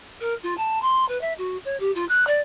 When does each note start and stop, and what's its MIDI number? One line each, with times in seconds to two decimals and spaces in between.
0.21 0.35 70
0.43 0.54 65
0.58 0.82 81
0.82 1.07 84
1.09 1.20 71
1.21 1.34 76
1.38 1.57 66
1.65 1.77 73
1.80 1.91 67
1.95 2.05 65
2.09 2.27 90
2.27 2.41 74